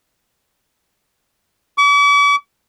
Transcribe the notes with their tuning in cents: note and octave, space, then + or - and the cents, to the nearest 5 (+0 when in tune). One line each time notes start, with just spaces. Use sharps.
D6 -45